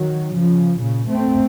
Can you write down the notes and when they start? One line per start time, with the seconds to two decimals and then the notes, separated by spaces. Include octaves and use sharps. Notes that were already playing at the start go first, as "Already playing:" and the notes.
Already playing: D#3 F#3
0.35 C#3 F3
0.80 A#2 C#3
1.10 A3 C4